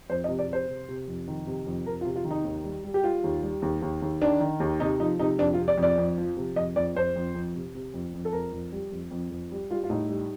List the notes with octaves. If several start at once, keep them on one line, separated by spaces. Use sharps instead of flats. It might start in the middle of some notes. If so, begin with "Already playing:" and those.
F2 C5
D#5
C3
D5
C3 C5
C3
C3
F2
D#3
C3
F2
F2 A#4
F4
C3
F4
D#3
D#4
D#2
G3
G3
G4
G3 F4
D#2
G3
D#2
D#2
D#2
D#3 D4
D#3
D#2
C3 D#4
F3 D#4
C3 D#4
F2 D4
F4
C3
D5
F2
D5
F2
F3
C3
F2 D#5
F2 D5
F2 C5
F2
F2
C3
C3
F2
F2
A4
F2 A#4
F2
G3
F2
F2
F2
G3
G3 F4
F4
A2 D#4
G3